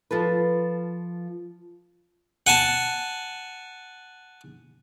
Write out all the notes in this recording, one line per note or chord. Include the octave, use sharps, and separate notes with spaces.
F3 F4 A4 B4
F#5 G#5 A5